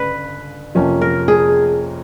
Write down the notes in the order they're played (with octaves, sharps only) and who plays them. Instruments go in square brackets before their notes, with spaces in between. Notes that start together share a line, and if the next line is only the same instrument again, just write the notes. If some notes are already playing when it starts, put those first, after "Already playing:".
Already playing: [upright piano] G1 C#3 [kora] B4
[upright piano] F2 C3 F3 A#3 C#4
[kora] A#4
G#4